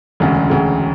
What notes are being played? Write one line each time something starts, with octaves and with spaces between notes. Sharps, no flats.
E1 D2 C#3
E1 D2 C#3